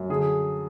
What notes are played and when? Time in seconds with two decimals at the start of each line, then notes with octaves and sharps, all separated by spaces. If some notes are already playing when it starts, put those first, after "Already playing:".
Already playing: F#2
0.10 D3 G#4